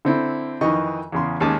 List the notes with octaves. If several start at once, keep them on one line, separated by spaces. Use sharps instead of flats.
D3 C4 E4
F2 D#3 E3 D#5 C#6
E2 C#3 C6
D#2 G#3 C#4 A5 D6 D#6